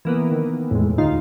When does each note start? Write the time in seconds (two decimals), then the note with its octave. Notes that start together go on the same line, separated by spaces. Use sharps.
0.05 E3 A#3 B3
0.31 D#3
0.71 E2 A2 G#3
0.98 D2 D#4 F4